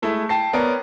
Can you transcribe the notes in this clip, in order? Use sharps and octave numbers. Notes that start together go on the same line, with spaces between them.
G#3 A3 E4
G5 A5 C7
B3 A#4 C#5 D5